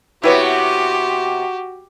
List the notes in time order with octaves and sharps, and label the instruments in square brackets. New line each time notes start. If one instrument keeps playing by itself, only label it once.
[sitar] C3 B3 [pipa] E4 B4 C#5 [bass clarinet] F#4 [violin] G4